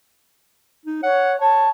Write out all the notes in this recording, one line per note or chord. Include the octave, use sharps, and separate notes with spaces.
D#4
C#5 F#5
C#5 A5